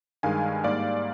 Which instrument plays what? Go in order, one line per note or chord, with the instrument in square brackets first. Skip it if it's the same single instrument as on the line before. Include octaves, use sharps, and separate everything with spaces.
[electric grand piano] G2 D#3 G#3 F5 G#5
G#2 G3 A#3 D5 F5